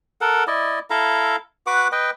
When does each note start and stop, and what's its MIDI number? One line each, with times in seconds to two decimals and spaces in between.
0.21 0.44 69
0.21 0.44 70
0.21 0.44 78
0.47 0.79 64
0.47 0.79 74
0.47 0.79 75
0.90 1.36 64
0.90 1.36 69
0.90 1.36 77
0.90 1.36 82
1.67 1.88 66
1.67 1.88 71
1.67 1.88 78
1.67 1.88 86
1.92 2.10 71
1.92 2.10 75
1.92 2.10 79